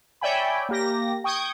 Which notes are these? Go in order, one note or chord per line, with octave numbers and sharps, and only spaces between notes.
C#5 D5 E5 G5 G#5 B5
A#3 G4 A#6
G5 C#6 D#6 G6 G#6